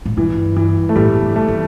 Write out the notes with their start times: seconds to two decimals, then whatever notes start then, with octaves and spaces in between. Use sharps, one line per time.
0.06 A2
0.17 G2 E3
0.56 E3
0.89 A3
0.96 A2 G3
1.22 D3
1.36 A3
1.48 E3